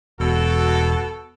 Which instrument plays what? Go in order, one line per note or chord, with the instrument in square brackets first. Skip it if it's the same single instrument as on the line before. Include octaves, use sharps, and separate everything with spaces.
[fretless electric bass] E1 [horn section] B2 F#4 A4